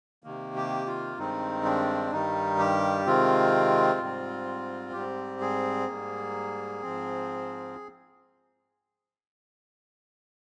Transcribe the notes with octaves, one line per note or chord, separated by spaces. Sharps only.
C3 D#3 A#3
G4
F4
G2 D#3 G#3 C4 D#4
D4
G2 D#3 G3 D#4
G4
C3 D#3 G#3 C4 F4
G#2 G3 C4
G#2 G3 C4 G4
G#4
G#2 G3 A#3
G#2 F3 C4